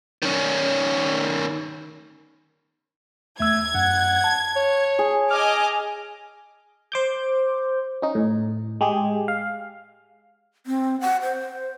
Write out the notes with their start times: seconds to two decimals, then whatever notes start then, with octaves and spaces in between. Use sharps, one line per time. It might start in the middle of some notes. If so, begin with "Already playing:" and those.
0.22 D#3 C#4
3.40 E2 A3 E6 G#6
3.75 F#2 F#5
4.24 A5
4.56 C#5
4.99 G#4
5.31 D#5 G#5 D6 F6
6.92 C5 D6 G6
8.02 C#4 D#4
8.15 A2
8.81 G#3 G4 G#4
9.28 F5
10.66 C4
11.01 F#5
11.23 C5